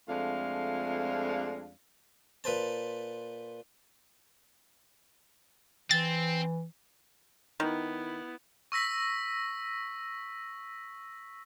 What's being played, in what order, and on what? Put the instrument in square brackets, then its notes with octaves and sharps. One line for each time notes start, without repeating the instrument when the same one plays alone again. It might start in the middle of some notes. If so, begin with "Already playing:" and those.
[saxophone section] F2 G#3 A3 D4 F4 F5
[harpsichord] A#2 B4 C5 A5
[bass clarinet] E3 [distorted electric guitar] C4 [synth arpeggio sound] A6
[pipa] D#3 [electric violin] B3 E4
[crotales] C#6 E6 A#6 B6